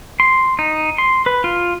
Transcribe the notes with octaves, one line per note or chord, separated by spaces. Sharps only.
C6
D#4
C6
B4
F4